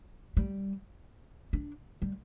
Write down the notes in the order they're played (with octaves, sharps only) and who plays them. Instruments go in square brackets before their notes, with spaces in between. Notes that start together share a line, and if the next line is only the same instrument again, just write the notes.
[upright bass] G3
D4
G3